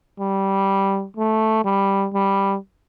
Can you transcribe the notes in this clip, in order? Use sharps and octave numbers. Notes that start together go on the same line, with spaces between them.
G3
A3
G3
G3